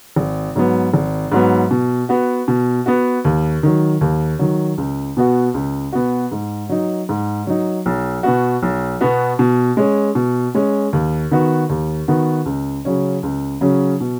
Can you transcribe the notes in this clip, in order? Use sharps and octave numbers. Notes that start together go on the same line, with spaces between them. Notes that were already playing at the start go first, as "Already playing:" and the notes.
G#1
G#2 F#3 B3
G#1
G#2 F#3 B3
B2
B3 F#4
B2
B3 F#4
D#2
D#3 F#3
D#2
D#3 F#3
C#2
B2 B3 F#4
C#2
B2 B3 F#4
G#2
F#3 D#4
G#2
F#3 D#4
B1
B2 B3 F#4
B1
B2 B3 F#4
B2
G#3 C#4
B2
G#3 C#4
D#2
D#3 B3 F#4
D#2
D#3 B3 F#4
C#2
C#3 F#3 C#4
C#2
C#3 F#3 C#4
B2